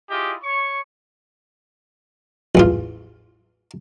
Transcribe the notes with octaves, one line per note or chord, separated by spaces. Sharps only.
E4 F4 G4 G#4 D#5
C#5 C#6
A1 E2 F4